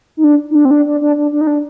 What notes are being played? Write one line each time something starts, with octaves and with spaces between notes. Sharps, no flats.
D#4
D4
D#4
D4
C4
D4
D4
D4
D4
D4
D#4
D4